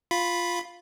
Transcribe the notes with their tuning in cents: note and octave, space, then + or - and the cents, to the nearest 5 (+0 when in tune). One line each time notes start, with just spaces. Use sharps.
F4 +0 B5 +0